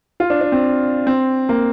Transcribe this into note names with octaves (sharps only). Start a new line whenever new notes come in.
F4
D4
D4
C4
C4
A#3